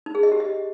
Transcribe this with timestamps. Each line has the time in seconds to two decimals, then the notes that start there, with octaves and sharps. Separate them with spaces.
0.06 D#4
0.15 G#4
0.23 D#5
0.32 G4
0.40 D#5